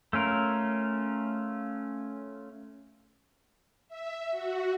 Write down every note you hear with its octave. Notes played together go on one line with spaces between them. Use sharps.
A3 C#4 F4 A#4
E5
F#4